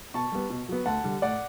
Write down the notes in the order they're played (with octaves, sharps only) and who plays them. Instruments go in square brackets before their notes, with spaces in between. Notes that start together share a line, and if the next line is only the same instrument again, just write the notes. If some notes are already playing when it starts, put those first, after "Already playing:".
[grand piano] B2 A5 C#6
G3 B3
B2
F#3 B3
D2 F#5 A5
D3 G3
A2 D5 F#5